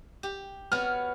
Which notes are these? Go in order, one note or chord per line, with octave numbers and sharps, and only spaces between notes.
G4
B3 F#4 C#5 F6